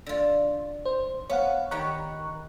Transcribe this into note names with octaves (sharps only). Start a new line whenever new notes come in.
D3 F4
C5
B3 C#5 F5 F#5
D#3 B3 G4 A#5 C#6 F#6